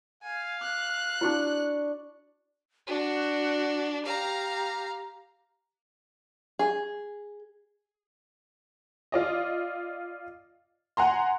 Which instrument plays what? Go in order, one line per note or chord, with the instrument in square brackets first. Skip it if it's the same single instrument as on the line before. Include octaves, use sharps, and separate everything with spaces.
[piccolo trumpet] F5 [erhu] G#5
[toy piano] D6 [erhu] F#6
[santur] D4 D5 C#6 [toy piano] E4 F#4
[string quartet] D4 [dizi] F#4
[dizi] G4 [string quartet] F5 A#5
[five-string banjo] G#4
[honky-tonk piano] F4 D5 D#5
F#5 G#5 A#5 C6